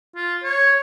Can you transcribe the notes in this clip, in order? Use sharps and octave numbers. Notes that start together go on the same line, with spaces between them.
F4
C#5